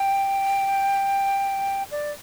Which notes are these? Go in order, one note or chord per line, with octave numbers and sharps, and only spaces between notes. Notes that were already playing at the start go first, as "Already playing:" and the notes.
Already playing: G5
D5